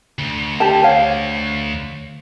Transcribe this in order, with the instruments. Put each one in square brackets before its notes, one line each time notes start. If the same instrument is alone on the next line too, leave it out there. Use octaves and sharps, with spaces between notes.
[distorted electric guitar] D2
[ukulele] G4 A5
C5 C#5 F5